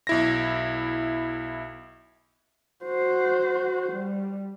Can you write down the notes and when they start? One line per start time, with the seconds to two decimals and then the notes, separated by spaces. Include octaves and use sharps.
0.07 B1 E4 A#6
2.85 F#4 C5
3.92 G3